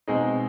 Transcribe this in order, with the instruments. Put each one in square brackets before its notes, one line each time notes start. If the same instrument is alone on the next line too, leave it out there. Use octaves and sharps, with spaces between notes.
[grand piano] B2 G#3 C4 D#4